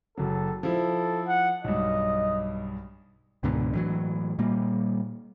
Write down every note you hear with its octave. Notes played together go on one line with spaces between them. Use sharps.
F#1 F#3 A4
F3 E4 A4
F#5
B1 G2 D#5
C#2 G#2 B2 D3
A2 E3 F#3
A#2 G3 A#3